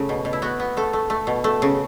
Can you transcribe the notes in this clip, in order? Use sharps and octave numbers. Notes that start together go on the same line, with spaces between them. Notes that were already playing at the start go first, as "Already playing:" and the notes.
Already playing: C#3 A3
B2
B2
E4
B3 F#4
B3
A3 A4
A3
A3
B2
A3
C#3